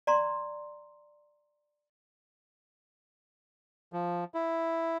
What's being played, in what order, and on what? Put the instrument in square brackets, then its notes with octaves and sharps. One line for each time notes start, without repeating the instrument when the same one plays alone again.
[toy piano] D5 A#5 C6
[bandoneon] F3
E4